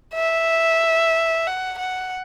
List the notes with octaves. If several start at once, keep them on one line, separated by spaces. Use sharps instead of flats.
E5
F#5
F#5